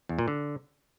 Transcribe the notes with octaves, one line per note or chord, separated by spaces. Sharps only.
E2
A#2
D3